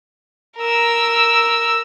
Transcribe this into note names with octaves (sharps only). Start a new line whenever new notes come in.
A#4 E6